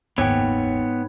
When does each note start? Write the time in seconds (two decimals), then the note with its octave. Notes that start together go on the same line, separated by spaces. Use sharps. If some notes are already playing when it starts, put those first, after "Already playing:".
0.18 F#1 D#2 G#2 B3 C#5 G5